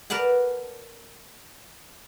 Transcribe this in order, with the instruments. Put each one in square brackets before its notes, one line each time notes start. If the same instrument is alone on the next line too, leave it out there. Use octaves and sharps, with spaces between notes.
[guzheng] A#4 B4 D5 F#5 A5